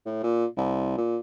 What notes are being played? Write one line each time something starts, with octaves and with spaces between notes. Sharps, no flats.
A2
A#2
C2
A#2